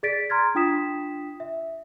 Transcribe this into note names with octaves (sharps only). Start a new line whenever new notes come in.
G#4 D5 A6 B6 D7
A#5 C6 F6 G#6 A6
D4 F4 G5 D#6 B6 E7
E5